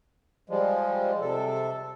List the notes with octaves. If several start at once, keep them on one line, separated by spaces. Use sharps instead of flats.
F3 G3 G#3
C3 A4